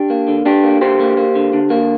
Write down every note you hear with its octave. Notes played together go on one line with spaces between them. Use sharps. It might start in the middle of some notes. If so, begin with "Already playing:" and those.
Already playing: D4 G4
A#3
D3
D3 D4 G4
A#3
D3 G4 C5
A#3
A#3
D3
D3
A#3